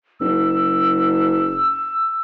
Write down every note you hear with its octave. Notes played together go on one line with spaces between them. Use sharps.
F#1 E6